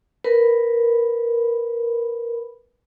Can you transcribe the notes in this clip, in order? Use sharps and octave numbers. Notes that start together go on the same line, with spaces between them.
A#4 B4 B5